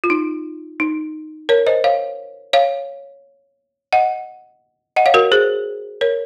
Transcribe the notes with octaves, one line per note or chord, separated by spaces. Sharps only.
F4
D#4
D#4
A#4 C#5
C5 D#5
C#5 F5
C#5 F5
D#5 F#5
D#5 F#5
C#5 F5
F#4 A#4
G#4 C5
A#4 C#5